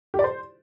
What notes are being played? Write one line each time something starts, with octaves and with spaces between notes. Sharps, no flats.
G4
D5
C5